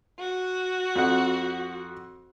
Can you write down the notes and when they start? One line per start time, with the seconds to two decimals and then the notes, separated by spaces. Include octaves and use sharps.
0.19 F#4
0.96 F2 F#5